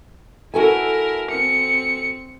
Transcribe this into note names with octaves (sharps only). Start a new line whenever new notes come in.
E4 F#4 A4 A#4 G#5
C4 C#7